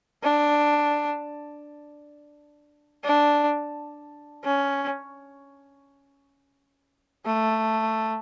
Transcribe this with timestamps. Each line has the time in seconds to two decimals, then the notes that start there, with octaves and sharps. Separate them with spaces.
0.23 D4
3.04 D4
4.44 C#4
7.25 A3